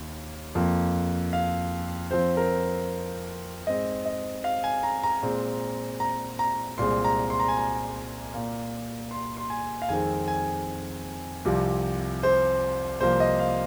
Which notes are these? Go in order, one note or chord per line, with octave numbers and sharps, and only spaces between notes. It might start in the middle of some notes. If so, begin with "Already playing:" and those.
Already playing: D#2 D#3
F2 F3 A#3
F5
F2 F3 C4 C5
A#4
G#2 G#3 C4 D#5
D#5
F5
G#5
A#5
A#5
A#2 G#3 C4
A#5
A#5
C2 A#2 G#3 C4 C6
A#5
C6
A#5
G#5
A#5
A#2 A#3
C6
C6
G#5
F5
F2 D#3 G#3 C4 G#5
G#5
C2 C3 F3
C5
C2 C3 F3 A#3 C5
D#5
F5